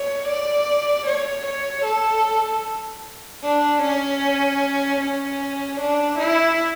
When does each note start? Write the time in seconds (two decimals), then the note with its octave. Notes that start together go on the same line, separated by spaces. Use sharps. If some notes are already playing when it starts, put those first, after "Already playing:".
Already playing: C#5
0.28 D5
1.06 C#5
1.46 C#5
1.85 A4
3.43 D4
3.82 C#4
5.01 C#4
5.80 D4
6.19 E4